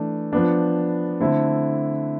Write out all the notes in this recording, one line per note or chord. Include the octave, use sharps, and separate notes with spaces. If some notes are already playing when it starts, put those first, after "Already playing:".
Already playing: E3 A3 D4
F3 B3 D4
D3 A3 C4 E4